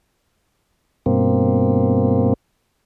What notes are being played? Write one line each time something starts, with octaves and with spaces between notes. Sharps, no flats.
G2 B2 A#3 C4